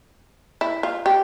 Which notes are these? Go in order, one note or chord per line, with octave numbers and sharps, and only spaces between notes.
E4
F4
G4